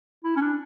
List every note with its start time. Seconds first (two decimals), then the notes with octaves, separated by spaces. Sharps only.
0.24 E4
0.36 C#4
0.42 D4